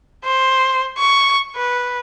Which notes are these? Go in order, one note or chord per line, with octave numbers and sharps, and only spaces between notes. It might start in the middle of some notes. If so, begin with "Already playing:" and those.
C5
C#6
B4